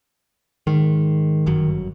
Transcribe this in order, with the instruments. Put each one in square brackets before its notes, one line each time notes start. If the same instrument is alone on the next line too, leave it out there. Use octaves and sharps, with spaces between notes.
[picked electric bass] G#2 [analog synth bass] D#3
[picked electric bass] G1 F#2 F#3